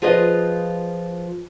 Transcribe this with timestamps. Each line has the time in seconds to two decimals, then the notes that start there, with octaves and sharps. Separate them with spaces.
0.02 F3 F4 G#4 B4 D#5